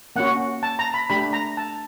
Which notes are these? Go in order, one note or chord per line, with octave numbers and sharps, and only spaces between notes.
A#3 C#4 F#4 F#5
A5
A#5
B5
A3 D4 G4 B5
A#5
A5